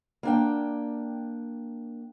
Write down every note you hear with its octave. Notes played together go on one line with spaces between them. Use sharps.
A#3 D4 G5